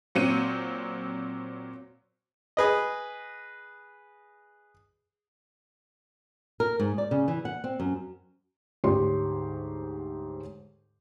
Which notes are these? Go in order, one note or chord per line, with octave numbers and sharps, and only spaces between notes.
A#2 F#3 C4 C#7 D#7
G#4 B4 D#5
A#4
G#2
D5
C#3
E3
F#5
C4
F#2
D2 G#2 G4 C#5 C6